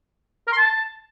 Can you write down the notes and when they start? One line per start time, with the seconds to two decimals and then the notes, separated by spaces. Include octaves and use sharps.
0.47 A#4
0.52 C6
0.57 A5